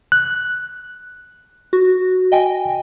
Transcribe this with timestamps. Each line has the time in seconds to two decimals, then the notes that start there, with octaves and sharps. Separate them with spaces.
0.12 F#6
1.73 F#4
2.32 D#5 G5 G#5